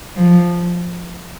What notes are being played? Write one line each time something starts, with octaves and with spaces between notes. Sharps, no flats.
F3